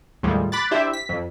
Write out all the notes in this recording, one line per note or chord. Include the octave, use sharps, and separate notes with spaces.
D#2 A2 F3 G3 G#3
B5 D6 F#6 A6
D4 E4 G4 C5 E5
B6
F2